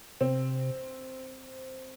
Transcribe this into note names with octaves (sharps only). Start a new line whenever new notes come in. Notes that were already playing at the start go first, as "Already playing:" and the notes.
C3 C4